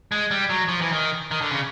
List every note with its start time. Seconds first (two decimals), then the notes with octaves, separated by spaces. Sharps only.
0.12 G#3
0.31 G3
0.50 F#3
0.68 F3
0.81 E3
0.92 D#3
1.31 D#3
1.41 D3
1.51 C#3